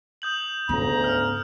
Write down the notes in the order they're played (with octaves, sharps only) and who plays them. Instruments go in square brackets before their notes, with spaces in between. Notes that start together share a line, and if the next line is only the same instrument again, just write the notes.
[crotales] D#6 G6 F#7
[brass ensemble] D2 C#3 A#5 [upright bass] G#2 B3
[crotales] F6